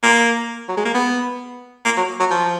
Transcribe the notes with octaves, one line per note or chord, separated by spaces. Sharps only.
A#3
F#3
G#3
A#3
B3
A#3
F#3
F#3
F3